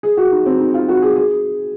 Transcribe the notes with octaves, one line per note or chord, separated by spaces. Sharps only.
G#4
F#4
D#4
C4
D#4
F4
F#4
G#4
G#4